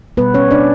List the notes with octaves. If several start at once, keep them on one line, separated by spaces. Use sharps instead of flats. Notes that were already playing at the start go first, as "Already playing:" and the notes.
B2 G3 B3 B4
C#4 C#5
D4 D5